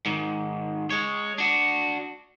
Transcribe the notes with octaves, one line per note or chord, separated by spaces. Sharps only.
G#2 D#3
G#3 C#5
D4 F#4